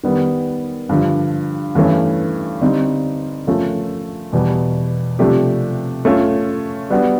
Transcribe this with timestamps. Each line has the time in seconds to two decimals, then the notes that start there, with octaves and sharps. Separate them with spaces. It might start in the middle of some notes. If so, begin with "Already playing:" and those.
0.04 D#3 G3 B3
0.89 G2 D3 F3
1.75 G2 E3 A3 C#4
2.61 D3 G3 C4 D#4
3.47 F3 A3 C#4 F4 A#4
4.33 E2 B2 G3 B3
5.19 C3 F3 A3 D4 G4
6.05 A3 C#4 F4
6.90 G3 B3 D4 F#4